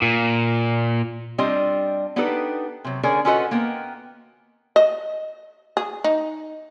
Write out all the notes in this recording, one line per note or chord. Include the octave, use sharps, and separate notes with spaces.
A#2
G3 C4 D4 F4 D#5
B3 D4 D#4 G4 A4 B4
C3 F#3
D3 C#4 G#4 A#4 D5
C#4 F4 F#4 A4 B4 D#5
A#3 B3 A#4 G5
D#5
G#4
D#4